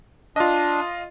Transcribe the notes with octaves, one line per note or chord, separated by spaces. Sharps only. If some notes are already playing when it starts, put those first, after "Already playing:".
D4 F4 D#5